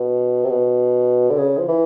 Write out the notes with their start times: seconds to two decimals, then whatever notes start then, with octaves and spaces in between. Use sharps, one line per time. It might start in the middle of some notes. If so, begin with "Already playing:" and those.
Already playing: B2
0.44 C3
0.50 B2
1.30 D3
1.38 C#3
1.59 F3
1.68 E3